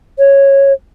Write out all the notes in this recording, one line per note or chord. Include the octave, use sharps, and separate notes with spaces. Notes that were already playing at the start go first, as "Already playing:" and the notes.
C#5